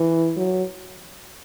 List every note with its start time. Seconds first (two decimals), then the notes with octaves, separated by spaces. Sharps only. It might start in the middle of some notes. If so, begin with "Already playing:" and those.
Already playing: E3
0.36 F#3